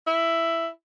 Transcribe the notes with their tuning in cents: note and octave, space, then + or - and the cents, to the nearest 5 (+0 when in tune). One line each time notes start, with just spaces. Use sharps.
E4 +5